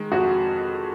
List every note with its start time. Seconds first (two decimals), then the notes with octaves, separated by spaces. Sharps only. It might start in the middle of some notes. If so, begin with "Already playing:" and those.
Already playing: D#3 G#3
0.12 F2 F#4